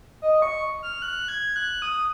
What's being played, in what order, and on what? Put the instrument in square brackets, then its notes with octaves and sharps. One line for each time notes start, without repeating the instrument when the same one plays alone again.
[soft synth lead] D#5
C#6
F6
F#6
G#6
F#6
D#6